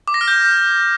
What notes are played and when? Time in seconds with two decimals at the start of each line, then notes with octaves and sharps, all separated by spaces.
0.08 D6
0.14 A#6
0.21 F6
0.28 G6